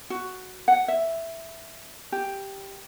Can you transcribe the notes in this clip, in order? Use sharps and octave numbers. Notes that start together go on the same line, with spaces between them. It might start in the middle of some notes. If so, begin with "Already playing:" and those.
F#4
F#5
E5
G4